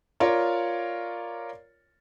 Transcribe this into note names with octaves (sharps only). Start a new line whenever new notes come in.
F4 A#4 C#5 D5